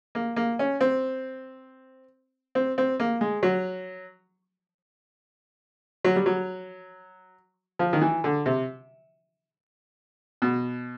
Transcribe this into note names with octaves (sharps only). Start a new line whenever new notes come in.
A#3
A#3
C#4
C4
C4
C4
A#3
G#3
F#3
F#3
G3
F#3
F3
D#3
E3
D3
C3
B2